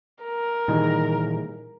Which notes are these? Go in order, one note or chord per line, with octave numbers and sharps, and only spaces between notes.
A#4
A#2 D#3 E3 G3 D#4 G#4